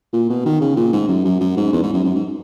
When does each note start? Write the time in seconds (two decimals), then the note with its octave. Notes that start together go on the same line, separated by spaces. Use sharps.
0.13 A#2
0.29 B2
0.45 D#3
0.61 C#3
0.77 A#2
0.93 G#2
1.08 F#2
1.25 F#2
1.40 F#2
1.57 G#2
1.73 E2
1.82 G#2
1.93 F#2
2.04 F#2
2.15 G#2